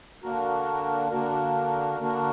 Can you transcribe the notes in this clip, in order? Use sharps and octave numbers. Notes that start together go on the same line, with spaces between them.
D3 A#3 D4 F#4 A#4
D3 A#3 D4 F#4 A#4
D3 A#3 D4 F#4 A#4